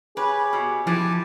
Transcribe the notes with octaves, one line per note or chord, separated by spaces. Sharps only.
G4 G#4 B4 C#5
B2
E3 F3 G4 G#5 A5